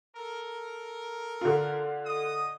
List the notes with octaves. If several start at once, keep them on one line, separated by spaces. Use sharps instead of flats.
A4 A#4
D3 F4
D#5 D#6